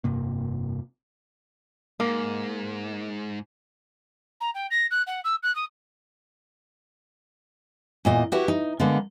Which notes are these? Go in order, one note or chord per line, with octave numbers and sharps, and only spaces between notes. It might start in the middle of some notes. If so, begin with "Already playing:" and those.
F1 G2 C3 A#3
G#2 A#3
A#5
G5
A#6
F#6
F#5
E6
F#6
D#6
E2 A#2 D#5
E4 F#4 G4 B4 E5
D#4
D3 G#3 A#3 B3